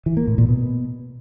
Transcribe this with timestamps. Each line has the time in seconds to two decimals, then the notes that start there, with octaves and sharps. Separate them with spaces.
0.06 E3
0.17 A#3
0.27 A2
0.38 A#2
0.49 B2